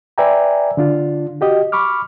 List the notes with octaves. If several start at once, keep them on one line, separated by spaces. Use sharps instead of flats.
B4 D5 E5 G5 G#5 A#5
D3 D4 F4
F#4 G4 D#5
B5 C#6 D6 F6